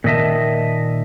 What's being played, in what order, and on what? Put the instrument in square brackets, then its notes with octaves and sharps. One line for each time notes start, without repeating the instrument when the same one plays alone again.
[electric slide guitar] A#2 D#3 D#5 E5 A5